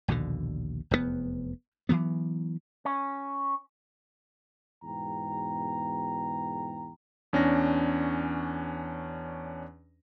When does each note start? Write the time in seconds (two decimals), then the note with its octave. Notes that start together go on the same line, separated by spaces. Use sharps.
0.08 A#1 D#2 B2 D3
0.91 F1 E2 B2 B3
1.89 E3 F#3 B3
2.85 C#4
4.84 E2 G#2 B2 G5 A#5
7.33 E2 C#4 D4 A#6